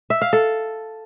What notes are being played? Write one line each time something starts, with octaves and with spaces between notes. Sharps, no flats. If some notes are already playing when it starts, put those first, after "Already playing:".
E5
F5
A4